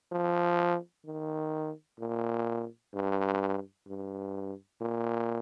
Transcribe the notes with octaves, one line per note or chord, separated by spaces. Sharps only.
F3
D#3
A#2
G2
G2
A#2